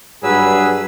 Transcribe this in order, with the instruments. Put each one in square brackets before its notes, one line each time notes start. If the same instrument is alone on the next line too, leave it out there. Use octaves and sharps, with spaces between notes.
[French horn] G2 [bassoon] F#3 [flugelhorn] G#4 [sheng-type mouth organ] B4 E6